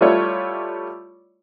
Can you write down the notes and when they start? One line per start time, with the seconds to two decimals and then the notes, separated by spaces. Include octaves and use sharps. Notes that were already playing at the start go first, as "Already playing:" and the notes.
0.01 G3 A3 E4 F4 C#5 D5